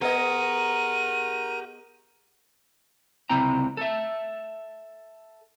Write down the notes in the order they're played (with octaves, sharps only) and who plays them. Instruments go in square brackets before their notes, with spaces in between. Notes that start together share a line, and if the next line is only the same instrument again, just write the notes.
[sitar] B3 G#4 D#5 [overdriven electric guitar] G4 F#5 [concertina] A#4 A#5 [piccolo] D#7
[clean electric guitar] C#2 C3 C4 E4 G5 A#5
A4 E5